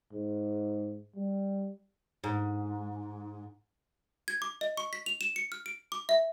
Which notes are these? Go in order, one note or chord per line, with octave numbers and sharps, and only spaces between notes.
G#2
G3
G#2
G#6
D6
D#5
C#6
B6
F7
E7
C#7
F6
D7
D6
E5